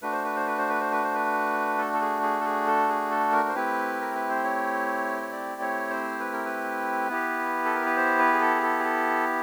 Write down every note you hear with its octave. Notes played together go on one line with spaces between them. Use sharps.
A3 D4 F#4 B4
C5
B4
C5
B4
C5
B4
C5
B4
C5
B4
A4
A4
G#4
G#4
A4
G#4
A4
G#4
A4
A#4
C5
A3 C4 E4 G4 B4
A#4
B4
C5
C#5
C#5
D5
C#5
C5
B4
A#4
B4
B3 E4 G4
A4
A#4
B4
C5
B4
G#4
A4
G#4
A4
G#4
A4